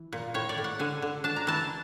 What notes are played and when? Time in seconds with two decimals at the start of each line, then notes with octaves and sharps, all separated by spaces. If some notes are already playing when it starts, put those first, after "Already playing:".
Already playing: E3
0.13 A#2
0.34 A2 C#5
0.49 D5
0.58 A2
0.64 F#5
0.79 D3 G#5
1.02 D3
1.24 D4 A5
1.36 A#5
1.47 E3 A5